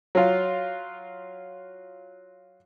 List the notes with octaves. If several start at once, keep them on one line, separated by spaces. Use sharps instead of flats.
F#3 F4